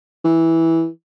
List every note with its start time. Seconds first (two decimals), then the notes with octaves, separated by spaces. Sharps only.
0.25 E3